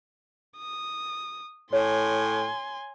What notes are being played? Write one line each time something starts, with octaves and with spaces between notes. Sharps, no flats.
D#6
A2 C#5 G#5 C6